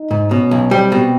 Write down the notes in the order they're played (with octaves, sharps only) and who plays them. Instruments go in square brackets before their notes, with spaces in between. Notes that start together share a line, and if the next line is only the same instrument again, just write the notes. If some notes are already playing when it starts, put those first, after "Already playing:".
Already playing: [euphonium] D#4
[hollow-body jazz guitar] G#2
[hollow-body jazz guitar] B2 [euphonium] C#4
[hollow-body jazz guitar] B1
[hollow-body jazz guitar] G3 [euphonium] C4
[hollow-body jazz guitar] B2